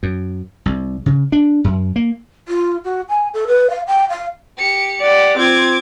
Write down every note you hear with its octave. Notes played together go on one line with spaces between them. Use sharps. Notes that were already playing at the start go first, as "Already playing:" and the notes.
F#2
C2
C#3
D4
F#2
A#3
F4
F#4
G#5
A4
B4
F5
G5
F5
G4 C#7
G4 D5 F#5
C4 F4 D6 G#6